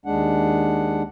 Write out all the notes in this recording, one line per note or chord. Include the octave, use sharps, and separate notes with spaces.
D#2 G#3 D4 F#5